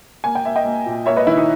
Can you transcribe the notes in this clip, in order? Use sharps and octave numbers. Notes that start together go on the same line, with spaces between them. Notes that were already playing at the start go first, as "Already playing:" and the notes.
A#3 G#5
G5
A#3 E5
D#5 G5
A#3
A#2
A#3 C#5 E5
B4 D#5
D#3 E4
D#4